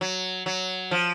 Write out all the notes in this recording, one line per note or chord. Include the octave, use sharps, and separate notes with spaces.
F#3
F#3
F3